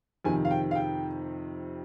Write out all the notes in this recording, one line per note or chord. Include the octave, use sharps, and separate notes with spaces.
F2 C3 D#3 G#5
F5
G5
F5
G5